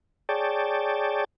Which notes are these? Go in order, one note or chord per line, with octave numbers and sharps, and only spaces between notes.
G#4 C#5 D5 G5 A5